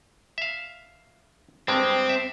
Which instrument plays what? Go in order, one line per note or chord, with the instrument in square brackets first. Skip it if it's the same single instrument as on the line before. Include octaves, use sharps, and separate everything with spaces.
[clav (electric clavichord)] E5 F5
[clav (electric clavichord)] G2 G3 G#3 [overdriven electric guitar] C4
[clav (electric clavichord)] E5